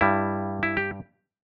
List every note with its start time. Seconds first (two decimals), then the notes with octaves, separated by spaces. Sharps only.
0.01 G2 G3 E4
0.63 E4
0.77 G4